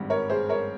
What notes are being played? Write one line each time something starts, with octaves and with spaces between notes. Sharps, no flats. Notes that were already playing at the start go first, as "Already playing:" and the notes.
Already playing: G#1 G2 G3
A#4 C#5
G#4 C5
A#4 C#5